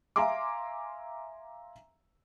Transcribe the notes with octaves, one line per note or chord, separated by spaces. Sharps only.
E5 F5 G#5 A#5 C6 D6